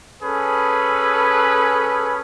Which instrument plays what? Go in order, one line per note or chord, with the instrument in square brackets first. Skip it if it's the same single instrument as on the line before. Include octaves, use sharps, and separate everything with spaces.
[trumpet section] C#4 G#4 A4 B4